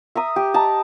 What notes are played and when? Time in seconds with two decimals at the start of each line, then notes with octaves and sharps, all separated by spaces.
0.15 E5 A#5 D#6
0.36 G4
0.54 D#5 A5 A#5